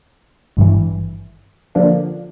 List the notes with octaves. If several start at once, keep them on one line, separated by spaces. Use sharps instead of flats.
G#1 G2 E3
D3 F3 A#3 D4